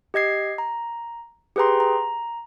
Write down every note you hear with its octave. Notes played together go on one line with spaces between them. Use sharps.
G4 D#5 G#6 C7
A#5
G4 G#4 B4 G5 A#5 C6
A#5